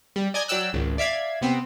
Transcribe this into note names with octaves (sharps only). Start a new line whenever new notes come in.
G3
D5 D#5 G#5 A#5 G#6
F#3 D5 G5 E6 F#6
G#1 C#2
D5 E5 F5 G#6
C3 B3 C4